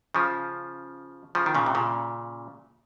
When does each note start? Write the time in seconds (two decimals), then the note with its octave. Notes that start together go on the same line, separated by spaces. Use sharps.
0.15 C#3 F3
1.35 C#3 F3
1.46 D#3
1.55 A#2 C#3
1.66 C3
1.75 A#2 C#3